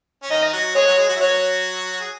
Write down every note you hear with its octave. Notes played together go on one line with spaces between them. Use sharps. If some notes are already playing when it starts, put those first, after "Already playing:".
C#4
D#3 D#4 D#5
F#3 F#4
G#3 G#4 C#5
F#3 F#4
G#3 G#4
F#3 F#4
E4
F#3 F#4 C#5
G#4